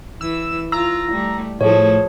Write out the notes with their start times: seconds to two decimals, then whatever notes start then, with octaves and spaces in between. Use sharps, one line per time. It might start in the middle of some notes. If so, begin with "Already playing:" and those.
0.21 E3 E6
0.72 F4 A#5 E6
1.11 G3 A3
1.61 A2 F3 G#4 A4 C#5